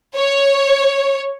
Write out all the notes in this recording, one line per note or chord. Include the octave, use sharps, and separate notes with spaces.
C#5